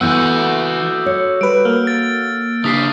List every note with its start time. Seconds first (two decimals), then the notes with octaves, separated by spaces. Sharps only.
0.01 E3 B3 F#4 A4 F#5 E6 F#6 G6
1.06 C#5
1.41 G3 B4 D7
1.65 A#3 F6
1.87 A6
2.64 C#3 D4 G4 D#6 B6 C7